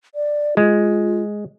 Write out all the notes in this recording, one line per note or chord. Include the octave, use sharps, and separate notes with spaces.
D5
G#3 F4